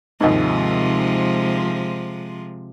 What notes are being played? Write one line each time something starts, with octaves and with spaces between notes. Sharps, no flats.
D#2 G#2 C3 F3 G#3